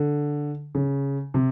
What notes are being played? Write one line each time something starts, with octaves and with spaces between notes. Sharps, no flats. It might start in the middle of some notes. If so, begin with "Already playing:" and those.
Already playing: D3
C#3
C3